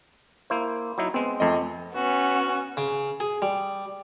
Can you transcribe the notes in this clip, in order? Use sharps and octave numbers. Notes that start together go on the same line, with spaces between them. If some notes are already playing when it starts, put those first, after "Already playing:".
A#3 E4 C5
F#3 D#4 E4
G#3 B3 C4
F2 A3 D#5
B3 C#4 F#4
C#3
G#4
G3